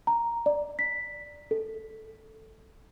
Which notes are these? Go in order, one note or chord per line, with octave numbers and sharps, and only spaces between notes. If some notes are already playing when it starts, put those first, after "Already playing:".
A#5
D5
B6
A4